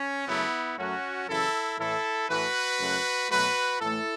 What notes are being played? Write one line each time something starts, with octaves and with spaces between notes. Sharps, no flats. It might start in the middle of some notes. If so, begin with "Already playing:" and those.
Already playing: C#4
F#2 C#3 F#3 A3 B3 E4
F#2 F#3 A3 C#4 F#4
F#2 C#3 E3 E4 A4
A2 E3 A3 E4 A4
A2 E3 A3 F#4 B4
F#2 C#3 A3
B2 F#3 A3 F#4 B4
A2 E3 A3 E4 A4